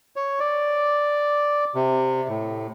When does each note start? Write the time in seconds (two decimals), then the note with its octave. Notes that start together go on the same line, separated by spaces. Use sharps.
0.16 C#5
0.40 D5
1.75 C3
2.29 A2